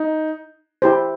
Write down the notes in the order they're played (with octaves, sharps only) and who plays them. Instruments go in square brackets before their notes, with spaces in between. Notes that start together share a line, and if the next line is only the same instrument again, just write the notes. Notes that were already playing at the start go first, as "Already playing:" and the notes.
Already playing: [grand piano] D#4
[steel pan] E4 G4 C5